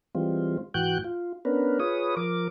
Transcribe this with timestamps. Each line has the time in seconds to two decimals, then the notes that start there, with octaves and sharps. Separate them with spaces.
0.15 E3 G3 G#3 C4 F4
0.74 G#2 E3 F#4 G5 F#6 G6
1.04 F4
1.45 B3 C#4 D4 A#4 B4
1.80 F4 G#4 B4 C#5 D#6
2.17 F3 A#4 D6